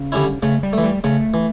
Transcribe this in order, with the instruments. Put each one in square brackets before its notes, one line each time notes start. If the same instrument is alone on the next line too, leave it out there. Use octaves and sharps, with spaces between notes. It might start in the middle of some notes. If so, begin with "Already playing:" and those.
Already playing: [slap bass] C#3
[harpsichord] D3 G3 C#4 E4
[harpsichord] C#3 [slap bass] A3
[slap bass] G3
[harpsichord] E3 A3
[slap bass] G3
[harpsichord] C#3 [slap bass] A3
[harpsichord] E3